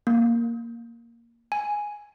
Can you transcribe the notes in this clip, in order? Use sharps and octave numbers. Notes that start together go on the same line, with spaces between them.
A#3
G#5